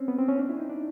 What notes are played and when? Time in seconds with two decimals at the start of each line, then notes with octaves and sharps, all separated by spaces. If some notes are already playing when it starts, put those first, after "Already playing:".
Already playing: C4 C#4
0.08 B3
0.18 C4
0.28 C#4
0.39 D4
0.49 E4
0.60 D#4
0.69 D4